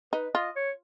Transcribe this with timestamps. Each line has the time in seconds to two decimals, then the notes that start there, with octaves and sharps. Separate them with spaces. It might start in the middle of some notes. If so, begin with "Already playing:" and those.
0.13 D#4 B4
0.34 F4 D#5
0.56 C#5